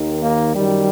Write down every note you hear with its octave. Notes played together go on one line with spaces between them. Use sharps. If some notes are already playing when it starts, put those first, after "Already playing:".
Already playing: D#2 D#3
A#3
F#2 D#3 G3